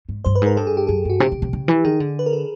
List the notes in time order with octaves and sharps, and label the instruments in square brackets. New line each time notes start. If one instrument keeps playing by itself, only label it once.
[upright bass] G#2
[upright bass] G2 [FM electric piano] C5
[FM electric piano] B4
[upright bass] G#2 [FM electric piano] A#4
[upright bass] G2 [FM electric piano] A4
[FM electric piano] G#4
G4
[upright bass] F#2 [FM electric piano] G#4
[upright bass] G2 [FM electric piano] F#4
[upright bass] C3 [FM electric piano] G4
[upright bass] C3
C3
C#3
E3
[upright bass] D#3 [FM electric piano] G#4
[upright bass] D3
[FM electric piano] B4
A#4
A4